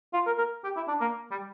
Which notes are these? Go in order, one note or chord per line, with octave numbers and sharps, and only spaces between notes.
F4
A#4
A#4
G4
E4
D4
A#3
G3